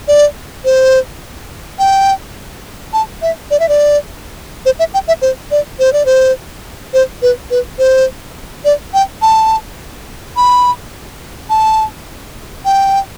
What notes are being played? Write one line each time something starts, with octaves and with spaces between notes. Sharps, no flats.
D5
C5
G5
A5
E5
D5
E5
D5
C5
E5
G5
E5
C5
D5
C5
D5
C5
C5
B4
B4
C5
D5
G5
A5
B5
A5
G5